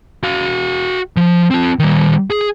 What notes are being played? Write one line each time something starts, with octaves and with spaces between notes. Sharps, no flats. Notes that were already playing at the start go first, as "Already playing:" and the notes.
F#4 F5
F3
C4 F4
D#3 G3
G#4